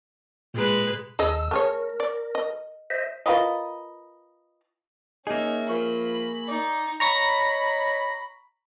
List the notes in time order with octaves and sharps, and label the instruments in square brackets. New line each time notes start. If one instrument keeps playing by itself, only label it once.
[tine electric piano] A#2 [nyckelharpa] G#3 B4
[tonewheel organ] D#2 E6 [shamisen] G#4 A4 D#5
[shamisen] A3 G#4 C#5 [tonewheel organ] A#4
[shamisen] D5
D#5
[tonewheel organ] C5 D#5 E5
[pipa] F4 A#4 B4 D#5
[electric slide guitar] A#3 G#4 [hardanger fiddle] C#4 E5 [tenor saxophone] D#4
[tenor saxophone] F3 [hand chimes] A#4 C#6 [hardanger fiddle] B5
[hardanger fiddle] D#4 [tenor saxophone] D5
[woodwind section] C#5 D#5 B5 [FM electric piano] A#5 C#6 A#6